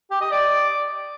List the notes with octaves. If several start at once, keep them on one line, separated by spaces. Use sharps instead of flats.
G4
D#5
D5